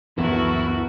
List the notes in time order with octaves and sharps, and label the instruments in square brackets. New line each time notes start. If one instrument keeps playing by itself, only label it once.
[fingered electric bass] C#2 F#2 E3 [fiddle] A3 F#4 [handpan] B3 A#4 [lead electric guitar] E4